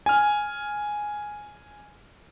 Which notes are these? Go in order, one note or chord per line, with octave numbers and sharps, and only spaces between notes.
G#5 F6